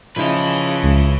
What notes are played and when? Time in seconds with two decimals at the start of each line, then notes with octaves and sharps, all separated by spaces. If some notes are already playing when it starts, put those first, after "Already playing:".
0.16 C#3 F3 D#4 E4 B4
0.83 C#2